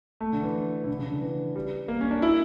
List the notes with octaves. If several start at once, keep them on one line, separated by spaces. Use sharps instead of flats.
A3
D3
E3
D3
E3
C#3
D3
E3
G3
A#3
C#4
D4
E4